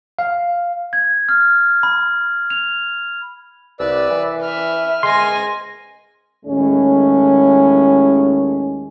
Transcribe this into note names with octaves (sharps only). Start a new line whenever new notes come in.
F5
G#6
F6
B5
F7
C2 B4 D5 E6
E3
B4 E5 F6
G#3 G#5 C6 A#6
D#2 A2 G#3 C#4